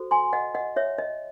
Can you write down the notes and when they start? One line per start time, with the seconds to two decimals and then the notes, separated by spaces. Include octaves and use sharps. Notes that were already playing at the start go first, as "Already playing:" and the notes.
Already playing: F#4 A4 C5
0.11 G#5 C6
0.33 D#5 F#5
0.54 D#5 F#5
0.76 C#5 E5
0.98 D#5